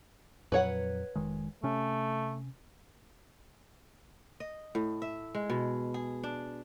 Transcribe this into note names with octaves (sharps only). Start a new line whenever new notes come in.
F2 A#2 F#3 B4 C#5 F#5
F1 D#3 G#3
C3 A3 C#4
D#5
A2
E5
G#3
B2
G#4
D4